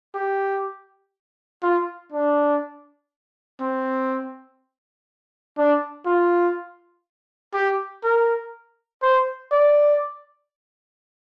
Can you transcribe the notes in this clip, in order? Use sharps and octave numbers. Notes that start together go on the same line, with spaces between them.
G4
F4
D4
C4
D4
F4
G4
A#4
C5
D5